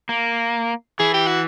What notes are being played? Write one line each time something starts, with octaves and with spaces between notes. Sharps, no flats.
A#3
E3 G#4
G4
F#4